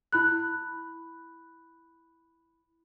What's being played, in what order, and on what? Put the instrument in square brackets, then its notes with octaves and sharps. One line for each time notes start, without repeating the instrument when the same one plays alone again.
[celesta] E4 B5 F#6